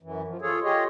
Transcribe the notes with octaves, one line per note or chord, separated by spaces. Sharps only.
F#2 E3
F3
F4 G#4 A4 C#5
F4 G4 G#4 C#5 D#5